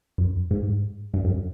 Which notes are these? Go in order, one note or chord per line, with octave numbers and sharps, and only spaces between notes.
F#2
G#2
G2
F#2